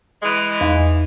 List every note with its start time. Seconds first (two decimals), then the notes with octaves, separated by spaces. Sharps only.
0.22 E3 G#3
0.61 E2